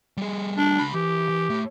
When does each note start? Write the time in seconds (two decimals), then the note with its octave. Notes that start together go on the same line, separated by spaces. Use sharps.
0.17 G3 G#4
0.58 D4
0.79 C#2 B5
0.94 E3 G4
1.29 E3
1.50 A3 C#5